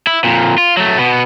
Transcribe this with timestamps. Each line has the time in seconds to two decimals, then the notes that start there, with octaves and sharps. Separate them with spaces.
0.07 E4
0.24 F2 A#2
0.58 F4
0.77 F#3 A3
0.98 B2 B3